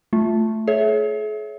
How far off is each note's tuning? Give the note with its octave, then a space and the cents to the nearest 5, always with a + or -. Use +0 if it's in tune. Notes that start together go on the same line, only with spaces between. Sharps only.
A3 +0 F4 +0
G#4 +45 C#5 +0 E5 +0